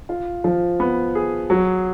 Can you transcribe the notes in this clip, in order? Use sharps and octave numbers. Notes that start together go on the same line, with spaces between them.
F4
F3
B3
G#4
F#3